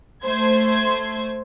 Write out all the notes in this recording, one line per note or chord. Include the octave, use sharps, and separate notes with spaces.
A3 C5 G#6